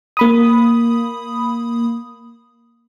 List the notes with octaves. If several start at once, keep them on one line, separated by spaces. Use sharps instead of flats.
A#3 B5 D#6